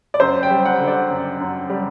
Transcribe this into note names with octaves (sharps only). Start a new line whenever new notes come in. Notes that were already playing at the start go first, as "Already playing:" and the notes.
D5
F#2 C5
G5
G3
F#5
D3
D5
F#2
F#2
G3